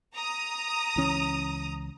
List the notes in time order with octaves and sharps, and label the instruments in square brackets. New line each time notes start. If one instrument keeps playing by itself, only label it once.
[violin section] A#5 D#6
[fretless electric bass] C#2 E3 C#4